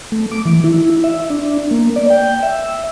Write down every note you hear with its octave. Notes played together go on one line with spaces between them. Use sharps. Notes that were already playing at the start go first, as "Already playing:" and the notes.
A3
D6
E3
E4
E5
D4
A#3
D5
G5
E5